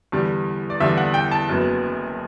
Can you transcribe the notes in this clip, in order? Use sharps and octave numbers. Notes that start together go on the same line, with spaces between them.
E2 D3 G3
D5
E2 D3 G3 E5
F#5
G5
A5
F#1 F#2 F#3 B3